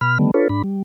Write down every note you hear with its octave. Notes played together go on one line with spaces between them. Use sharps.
B2 B5 F6
D3 D#3 G3 A3 B3
D4 F4 A4 B4 C#5
G#2 D4 B5
G3